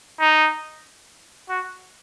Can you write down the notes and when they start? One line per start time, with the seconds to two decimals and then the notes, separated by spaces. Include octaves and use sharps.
0.20 D#4
1.49 F#4